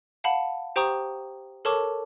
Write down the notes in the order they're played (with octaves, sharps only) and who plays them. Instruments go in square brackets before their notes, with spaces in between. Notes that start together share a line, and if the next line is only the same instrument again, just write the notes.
[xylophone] F5 F#5 A5 B5
G4 C5 G5 A#5 C#6 D#6
A4 A#4 C#5 A5 C#6 D6